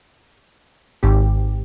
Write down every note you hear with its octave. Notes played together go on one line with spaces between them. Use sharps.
G#1 G#2 G4